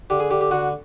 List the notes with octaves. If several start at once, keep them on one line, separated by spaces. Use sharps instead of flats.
D3 G4
G#4
D3 G4
G4
D3 F#4